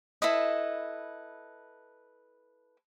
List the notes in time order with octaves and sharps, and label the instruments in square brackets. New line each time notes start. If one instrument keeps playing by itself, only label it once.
[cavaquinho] E4 A4 B4 D#5